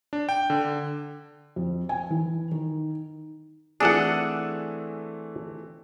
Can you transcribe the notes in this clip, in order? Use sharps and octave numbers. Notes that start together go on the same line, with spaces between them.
D4
G5
D3
F2
G#5
E3
D#3
E3 A3 C4 D4 G#4 A4 F#5